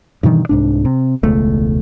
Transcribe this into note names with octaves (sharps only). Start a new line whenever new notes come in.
G2 B2 D#3 E3
C2 G#2 D4
C3
E1 C#2 A3